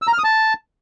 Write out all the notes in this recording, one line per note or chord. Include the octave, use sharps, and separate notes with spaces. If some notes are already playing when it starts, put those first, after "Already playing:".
E6
A#5
F6
D#6
A5